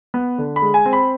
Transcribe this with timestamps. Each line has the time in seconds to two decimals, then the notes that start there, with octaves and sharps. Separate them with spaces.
0.14 B3
0.38 D3
0.56 B5
0.62 G#3
0.74 G#5
0.86 C4
0.93 B5